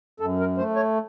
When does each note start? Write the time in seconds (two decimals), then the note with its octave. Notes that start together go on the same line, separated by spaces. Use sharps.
0.20 F#2 A4
0.39 A#4
0.58 A3 C5
0.76 C#5